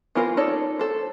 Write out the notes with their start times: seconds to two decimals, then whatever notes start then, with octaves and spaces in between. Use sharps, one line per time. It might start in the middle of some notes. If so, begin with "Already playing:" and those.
0.15 E3 B3 F4 A#4 C5
0.37 D#4 A4 C#5 D5
0.79 A4 C5